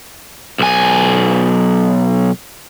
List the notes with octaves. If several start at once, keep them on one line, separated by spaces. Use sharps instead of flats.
B1 G#5